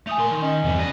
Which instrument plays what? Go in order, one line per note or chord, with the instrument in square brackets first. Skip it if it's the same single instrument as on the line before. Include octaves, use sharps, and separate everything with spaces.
[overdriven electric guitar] A3 [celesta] G#5 D#6 F7
[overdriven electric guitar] A#2 C6 [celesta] A#4
[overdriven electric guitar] D#3
[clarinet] C#4 [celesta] D#5
[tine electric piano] E2 G2 [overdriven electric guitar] C3 E3
[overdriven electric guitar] B3 D#5 [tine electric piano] G4 D5